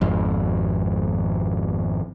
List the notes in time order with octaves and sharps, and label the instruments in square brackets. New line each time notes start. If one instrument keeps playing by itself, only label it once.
[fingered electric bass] G#1 F2